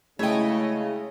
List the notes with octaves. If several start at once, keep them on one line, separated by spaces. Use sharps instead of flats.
C#3 G#3 A3 E4 C#5 D#5 G5